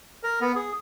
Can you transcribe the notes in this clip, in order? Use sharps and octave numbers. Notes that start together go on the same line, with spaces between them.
A#4
B3
G#4